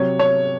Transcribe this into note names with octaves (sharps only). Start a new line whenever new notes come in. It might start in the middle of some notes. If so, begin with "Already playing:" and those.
Already playing: C3 F#3 C#5
C#5